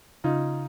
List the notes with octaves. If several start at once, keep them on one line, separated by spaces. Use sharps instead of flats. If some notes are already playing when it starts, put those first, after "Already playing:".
C#3 D#4 F4